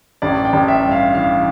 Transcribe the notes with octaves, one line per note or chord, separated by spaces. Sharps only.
A1 D5
G5
A1
E5
G2
F5
E3 F5